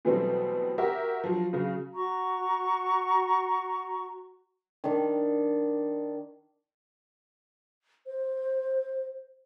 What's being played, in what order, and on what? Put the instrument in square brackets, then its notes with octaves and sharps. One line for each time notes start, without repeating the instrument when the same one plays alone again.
[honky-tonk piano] B2 E3 F#3 G3 A3 C4
F#4 G4 A#4 E5
F3 F#3
C#3 F#3
[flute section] F#4 A#5 C#6
[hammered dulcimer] D#3 D4
[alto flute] C5